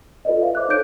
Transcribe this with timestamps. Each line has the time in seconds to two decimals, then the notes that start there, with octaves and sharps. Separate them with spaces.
0.25 F4 A4 B4 D5 D#5
0.41 E5 F5
0.55 C5 D6 F#6
0.68 D#4 A4 C#5 G6 D7